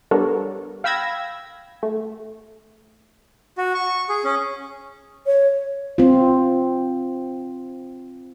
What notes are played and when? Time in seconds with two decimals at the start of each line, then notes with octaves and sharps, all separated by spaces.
0.11 G3 B3 D4 A4 A#4 C#5
0.84 F5 G5 B5 E6 G#6 A#6
1.83 A3
3.58 F#4
3.75 C#6
4.09 G#4
4.25 C#4
5.26 C#5
5.98 C4 F4